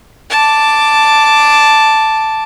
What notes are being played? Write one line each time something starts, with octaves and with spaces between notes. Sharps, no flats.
A5 D6